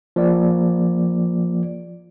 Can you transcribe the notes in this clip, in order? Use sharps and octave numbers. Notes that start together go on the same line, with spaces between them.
F3 A#3 D5